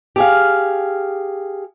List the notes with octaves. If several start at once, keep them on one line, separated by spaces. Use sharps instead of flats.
G4 G#4 F5